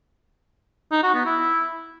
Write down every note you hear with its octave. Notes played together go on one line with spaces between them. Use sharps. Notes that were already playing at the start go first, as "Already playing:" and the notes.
D#4
F#4
B3
E4